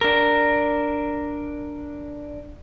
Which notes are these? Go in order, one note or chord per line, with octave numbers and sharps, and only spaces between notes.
D4 A#4